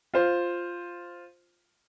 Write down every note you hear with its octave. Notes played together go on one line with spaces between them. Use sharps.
F4 C5